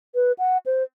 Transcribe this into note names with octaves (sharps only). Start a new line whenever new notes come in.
B4
F#5
C5